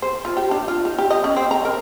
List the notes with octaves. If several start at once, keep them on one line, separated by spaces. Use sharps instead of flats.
C5
F4
G4
D4
F4
D#4
G4
D#5
C#4
C4
A#5
A#4